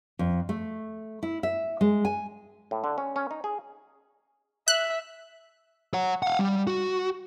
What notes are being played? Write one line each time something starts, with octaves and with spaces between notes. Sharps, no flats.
F2
A3
E4
E5
G#3
G#5
A2
D3
C#4
C#4
D#4
G#4
E5 F#6
C#5 F#5
F5 F#5
G3
F#4